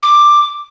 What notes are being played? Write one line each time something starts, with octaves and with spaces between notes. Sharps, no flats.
D6